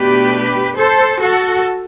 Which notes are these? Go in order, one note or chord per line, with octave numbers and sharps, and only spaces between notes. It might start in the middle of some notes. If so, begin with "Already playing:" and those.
Already playing: B2 A3 D4 G4 B4
A4 C5
F#4 A4